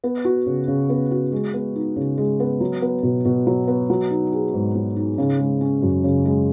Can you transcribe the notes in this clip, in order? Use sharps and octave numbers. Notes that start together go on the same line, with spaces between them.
B3
F#4
C#3
C#3
B3
F#4
G#3
B3
D#4
C#3
G#3
B3
F#3
B3
B2
B2
F#3
B3
F#3
D#4
G#4
G#2
F#3
D#4
C#3
G#3
C#4
F#2
C#3
G#3